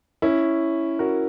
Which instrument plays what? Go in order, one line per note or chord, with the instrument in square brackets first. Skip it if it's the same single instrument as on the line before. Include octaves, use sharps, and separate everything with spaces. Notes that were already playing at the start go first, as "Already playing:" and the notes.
[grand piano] C#4 E4
F#4 A#4